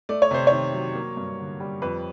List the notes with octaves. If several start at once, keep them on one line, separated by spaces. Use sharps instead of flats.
A3 D5
C#5
C3 C5
D#3 C#5
F#3
A#3
G2
D3
G3
F2 B4